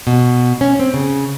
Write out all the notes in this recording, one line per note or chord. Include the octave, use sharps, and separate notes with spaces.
B2
C#4
C4
C#3